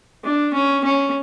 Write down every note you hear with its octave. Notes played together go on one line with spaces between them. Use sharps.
D4
C#4
C#4